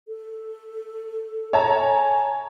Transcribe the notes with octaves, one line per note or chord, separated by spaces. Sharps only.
A4
A4 C#5 A5 A#5
G#5